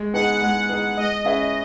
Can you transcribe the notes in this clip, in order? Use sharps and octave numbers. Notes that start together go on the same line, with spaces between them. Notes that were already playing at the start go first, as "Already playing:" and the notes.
Already playing: G#3
B3 D#4 G#4 D#5 F#5
G#3 F#5
B3 D#4 G#4 D#5
G#3 D#5
C#4 G#4 B4 E5